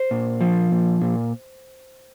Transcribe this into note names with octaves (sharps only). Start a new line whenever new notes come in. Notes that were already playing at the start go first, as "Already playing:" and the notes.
Already playing: C5
A#2
F3
A#2
A#2